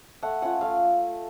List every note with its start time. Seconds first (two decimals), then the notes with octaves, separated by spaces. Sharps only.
0.23 A3 F#5
0.42 C#4 F4 F#5
0.61 A3 F5